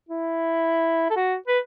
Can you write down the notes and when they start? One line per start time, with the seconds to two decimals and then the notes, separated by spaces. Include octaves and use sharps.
0.09 E4
1.10 A4
1.16 F#4
1.48 B4